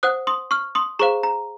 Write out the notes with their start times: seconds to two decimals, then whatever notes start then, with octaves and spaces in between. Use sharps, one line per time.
0.03 C5 F#5 D#6 F#6
0.27 C6 D#6
0.51 C#6 F6
0.75 C6 D#6
0.99 G#4 C5 F5 A#5 C#6
1.23 A#5